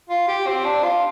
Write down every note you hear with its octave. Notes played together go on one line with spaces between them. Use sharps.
F4
G4
C4
D4
F4